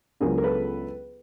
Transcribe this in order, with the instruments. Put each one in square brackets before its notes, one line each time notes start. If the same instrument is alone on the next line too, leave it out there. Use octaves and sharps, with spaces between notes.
[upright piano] C#2 C#3 F#3 B3 D4 [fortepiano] G#4 A#4
[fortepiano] A#4
A4 B4